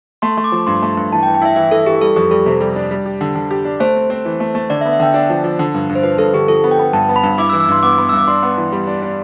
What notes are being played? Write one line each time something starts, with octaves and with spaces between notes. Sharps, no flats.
A3 C6
A3
D6
F3
G2 C6
A3
G2
E3 A5
G5
E3
G5
E4 E5
E3 E5
E3 A4
E3 G4
G3 A4
F2 G4
G3 A4
C3
G3
D4
G3
G4
D3
D3
G4
D4
A3 C5
C4
C4
E3
A3
A3
D3 D5
E5
B3
E5
D3 G5
D4
F3
F3
D3
G2
G2
C5
F3 B4
G2 A4
D3 G4
F3 A4
B3
G5
B3
G2 A5
B3
B5
G2
E4 D6
E6
E3
E6
G2 C6
B3 D6
B3
G2 E6
D6
D4 C6
B3
E3
G3
D4
D4